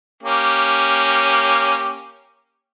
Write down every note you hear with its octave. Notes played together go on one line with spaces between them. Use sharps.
A#3 C#4 G4